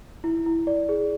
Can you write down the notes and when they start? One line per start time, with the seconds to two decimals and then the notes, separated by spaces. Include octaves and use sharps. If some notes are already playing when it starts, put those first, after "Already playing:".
0.24 E4
0.46 E4
0.67 D5
0.89 G#4